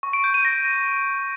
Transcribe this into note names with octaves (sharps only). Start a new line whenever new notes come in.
C#6
D7
G6
D#7
A#6